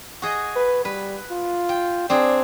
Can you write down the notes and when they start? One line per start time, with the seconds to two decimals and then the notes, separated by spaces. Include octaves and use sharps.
0.22 F#4 G#4 D#5
0.56 B4
0.85 G3 B4
1.31 F4
1.69 G5
2.10 C4 D4 G#4 D5